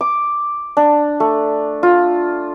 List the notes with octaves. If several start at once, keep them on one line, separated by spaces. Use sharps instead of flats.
D6
D4
A3
F4